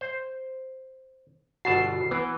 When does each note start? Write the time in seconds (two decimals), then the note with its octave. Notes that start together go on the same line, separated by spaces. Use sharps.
0.01 C5
1.65 G1 B2 F#4 A5 C7
2.11 E3 B3